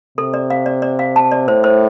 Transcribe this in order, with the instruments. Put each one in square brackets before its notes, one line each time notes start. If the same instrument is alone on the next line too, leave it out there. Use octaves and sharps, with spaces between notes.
[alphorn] C3 [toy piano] A4
[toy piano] D5
F5
D5
D5
F5
A5
D5
[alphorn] A2 [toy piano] C5
[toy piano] C5